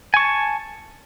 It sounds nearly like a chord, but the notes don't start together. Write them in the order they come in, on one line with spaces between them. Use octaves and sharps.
G#5 C#6 A5